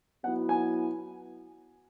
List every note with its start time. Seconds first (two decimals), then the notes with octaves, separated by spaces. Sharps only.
0.24 F#3 B3 E4 F#5
0.49 G#5